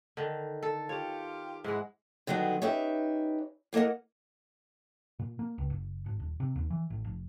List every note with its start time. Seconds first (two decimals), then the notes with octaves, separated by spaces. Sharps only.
0.17 D3 D#3
0.63 A4
0.89 F4 G4 C#5
1.64 G#2 G#3 E4 F#5
2.27 D3 D#3 F#3 G3 B3
2.62 C#4 D#4 G4 B4 E5
3.73 A2 A#3 A#4 D#5 F#5
5.19 A#2
5.39 A#3
5.58 C#2
5.70 F#1
6.06 G#1
6.20 D#1
6.40 C3
6.56 D#2
6.70 E3
6.90 A1
7.05 F1